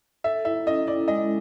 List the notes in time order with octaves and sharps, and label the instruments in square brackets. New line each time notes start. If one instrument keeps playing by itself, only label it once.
[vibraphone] A4 [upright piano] E5
[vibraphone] E4 [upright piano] E5
[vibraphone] C#4 [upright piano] D#5
[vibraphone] E4 [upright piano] D5
[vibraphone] G#3 [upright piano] D#5